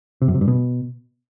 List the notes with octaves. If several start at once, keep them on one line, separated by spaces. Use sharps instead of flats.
C3
F#2
C3
G2
B2